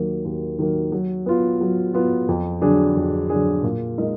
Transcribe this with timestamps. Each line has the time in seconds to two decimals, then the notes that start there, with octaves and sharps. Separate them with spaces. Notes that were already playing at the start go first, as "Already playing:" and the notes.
Already playing: D#2 D#3 F#3 A#3
0.25 D#2
0.59 D#3 F#3 A#3
0.92 F#3
1.26 B3 F4
1.61 F#3
1.94 B3 F4
2.28 F2
2.62 D3 F#3 D4 G#4
2.96 F2
3.29 D3 F#3 D4 G#4
3.63 A#2
3.97 G#3 D#4 A#4 D#5